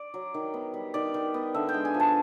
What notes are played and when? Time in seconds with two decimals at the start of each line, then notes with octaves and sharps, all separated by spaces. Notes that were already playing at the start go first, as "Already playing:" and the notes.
Already playing: D5
0.14 F#3
0.34 D#3
0.54 B3
0.74 G3
0.94 D#3 D5
1.14 D#3
1.34 B3
1.54 D3 E5
1.69 G5
1.74 G#3
1.85 G#5
1.94 F3
2.00 A5